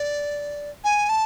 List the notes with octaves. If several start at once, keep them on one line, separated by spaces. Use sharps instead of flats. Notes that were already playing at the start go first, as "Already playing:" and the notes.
Already playing: D5
G#5
A5